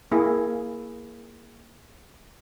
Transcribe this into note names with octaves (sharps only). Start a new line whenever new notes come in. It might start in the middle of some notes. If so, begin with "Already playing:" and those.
A#3 E4 G#4